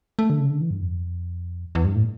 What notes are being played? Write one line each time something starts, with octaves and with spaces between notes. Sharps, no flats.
A3
D3
C#3
D3
E3
G2
F2
E2
G2
A2